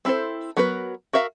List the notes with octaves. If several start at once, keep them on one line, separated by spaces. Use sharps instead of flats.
C4 E4 F#4 A4 C5
F#3 B3 F#4 A#4 B4
F#4 A#4 E5 F5